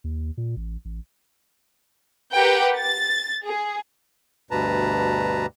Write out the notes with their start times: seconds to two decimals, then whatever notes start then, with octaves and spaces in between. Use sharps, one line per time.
0.04 D#2
0.37 A#2
0.57 A1
0.85 A1
2.34 G4 A#4 B4 F#5 G5
2.77 A6
3.45 G#4
4.51 D2 G2 B2 B4 A5 A#5